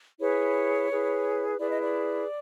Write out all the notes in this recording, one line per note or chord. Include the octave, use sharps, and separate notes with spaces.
E4 G#4 B4 C#5
E4 G#4 B4
E4 G#4 B4 D5
D#5
D5